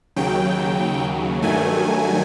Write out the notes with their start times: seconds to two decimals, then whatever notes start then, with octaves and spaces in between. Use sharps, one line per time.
0.16 D#2 C#3 F#3 G5
1.42 G2 D#3 F#3 A3 G#5